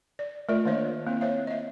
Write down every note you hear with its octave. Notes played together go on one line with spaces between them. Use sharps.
D5
A3 F4 A#4 D5 D#5
D#3 A#3 D4 C5 C#5 D#5
A#3 C4 E4
C5 C#5 E5 F5
D#5 E5